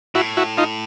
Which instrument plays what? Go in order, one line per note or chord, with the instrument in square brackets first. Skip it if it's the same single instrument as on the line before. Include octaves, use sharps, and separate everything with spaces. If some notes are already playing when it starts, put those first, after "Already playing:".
[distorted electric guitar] A2 [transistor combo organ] E4 F#4
[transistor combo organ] E4 F#4
D#4 F4